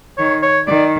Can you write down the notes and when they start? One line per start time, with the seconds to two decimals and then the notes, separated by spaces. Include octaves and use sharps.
0.18 D#3 C#5
0.42 C#5
0.67 D#3 D5